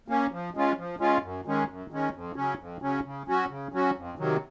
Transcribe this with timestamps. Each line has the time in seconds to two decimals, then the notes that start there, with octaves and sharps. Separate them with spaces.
0.08 A#3 C#4
0.32 F3
0.55 G#3 C#4 F4
0.77 F3
0.99 G#3 C#4 F4
1.23 F#2
1.45 D#3 G#3 C#4
1.68 F#2
1.91 D#3 G#3 C#4
2.14 F2
2.36 C#3 F#3 C#4
2.59 F2
2.82 C#3 F#3 C#4
3.05 C#3
3.28 F#3 C#4 F#4
3.50 C#3
3.72 F#3 C#4 F#4
3.96 F2
4.18 C3 D#3 F#3